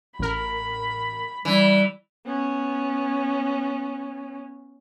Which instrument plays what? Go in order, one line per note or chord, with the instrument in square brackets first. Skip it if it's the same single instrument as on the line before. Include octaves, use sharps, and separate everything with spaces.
[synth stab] A1 A#4 [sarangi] B5
[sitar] E3 [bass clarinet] G3
[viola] B3 C#4